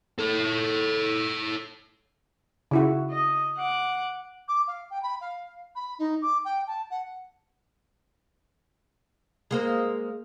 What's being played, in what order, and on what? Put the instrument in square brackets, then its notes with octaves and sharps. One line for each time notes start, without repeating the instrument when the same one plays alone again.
[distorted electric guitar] A4 C#5
[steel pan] C#3 E4 F#4
[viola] D#5
F#5 D6
[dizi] D6
F5
G5
B5
F5
B5
D#4
D6
G5
A5
F#5
[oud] G#3 A#3 C5